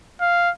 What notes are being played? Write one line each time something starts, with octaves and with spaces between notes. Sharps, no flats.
F5